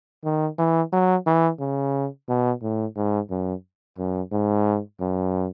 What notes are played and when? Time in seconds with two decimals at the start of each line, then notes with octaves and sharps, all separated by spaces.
0.24 D#3
0.58 E3
0.92 F#3
1.26 E3
1.60 C#3
2.28 B2
2.62 A2
2.96 G#2
3.30 F#2
3.98 F#2
4.32 G#2
5.00 F#2